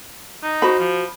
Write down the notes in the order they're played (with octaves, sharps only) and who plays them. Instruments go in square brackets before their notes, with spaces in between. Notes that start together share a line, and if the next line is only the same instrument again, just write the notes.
[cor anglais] D#4
[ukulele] F#4 C5 B5
[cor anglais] F3